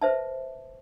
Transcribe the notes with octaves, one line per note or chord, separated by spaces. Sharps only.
B4 C5 E5 A5